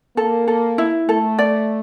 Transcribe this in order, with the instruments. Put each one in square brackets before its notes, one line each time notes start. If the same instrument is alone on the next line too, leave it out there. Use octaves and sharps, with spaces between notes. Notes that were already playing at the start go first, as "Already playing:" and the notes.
[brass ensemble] A#3 [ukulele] A4
[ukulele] A4
E4
[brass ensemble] A3 [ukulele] A4
[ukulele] D5